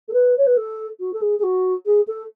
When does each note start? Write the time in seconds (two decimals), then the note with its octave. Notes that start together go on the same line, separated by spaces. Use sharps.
0.08 A4
0.13 B4
0.37 C#5
0.46 B4
0.57 A4
1.00 F#4
1.13 A4
1.21 G#4
1.39 G#4
1.43 F#4
1.86 G#4
2.07 A4